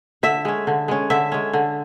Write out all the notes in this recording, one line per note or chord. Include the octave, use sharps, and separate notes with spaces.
D3 E5
G#3 C#4
D3
G#3 C#4
D3 E5
G#3 C#4
D3